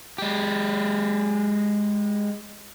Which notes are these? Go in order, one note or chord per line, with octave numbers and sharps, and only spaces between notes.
G#3 G4